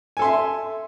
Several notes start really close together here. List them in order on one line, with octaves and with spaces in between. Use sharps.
G#5 A4 C6 E5